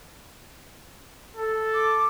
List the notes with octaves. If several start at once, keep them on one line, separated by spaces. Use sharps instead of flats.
A4
D6